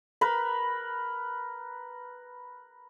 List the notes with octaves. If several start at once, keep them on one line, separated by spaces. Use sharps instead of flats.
A#4 B4 B5